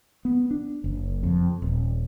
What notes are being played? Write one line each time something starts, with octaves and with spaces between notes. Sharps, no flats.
B3
D4
F#1
F2
D#1